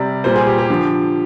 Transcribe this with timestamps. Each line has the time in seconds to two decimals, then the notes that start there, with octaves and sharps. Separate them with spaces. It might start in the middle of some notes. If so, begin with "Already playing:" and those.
Already playing: C3 G3 D5
0.24 A#2 G3 C5
0.36 G#4
0.47 G4
0.58 G4
0.70 D3 F3